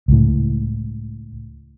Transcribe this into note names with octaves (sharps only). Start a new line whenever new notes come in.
C#2 A2